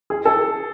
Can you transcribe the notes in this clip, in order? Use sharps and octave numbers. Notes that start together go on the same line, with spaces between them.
G#4
A4